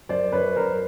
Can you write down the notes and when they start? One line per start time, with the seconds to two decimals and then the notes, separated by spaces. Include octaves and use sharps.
0.09 F#2 C5 D5
0.32 F#2 B4 C#5
0.56 F#2 A#4 C5